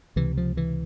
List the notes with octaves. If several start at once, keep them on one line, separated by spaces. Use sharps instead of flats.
C#2 C3 E3
F3
E3